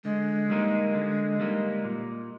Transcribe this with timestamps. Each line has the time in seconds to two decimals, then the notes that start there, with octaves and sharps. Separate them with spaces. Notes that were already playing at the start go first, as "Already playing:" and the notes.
0.04 D3 G#3
0.50 G3 A#3 D#4
0.94 D3
1.40 G3 A#3 D#4
1.84 A#2